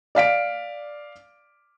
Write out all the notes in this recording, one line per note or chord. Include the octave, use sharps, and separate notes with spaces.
D5 F5 B6 D7